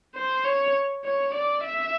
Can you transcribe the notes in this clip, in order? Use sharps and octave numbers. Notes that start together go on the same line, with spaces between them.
C5
C#5
C#5
D5
E5